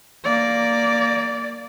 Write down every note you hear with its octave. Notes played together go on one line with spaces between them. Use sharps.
A#3 D5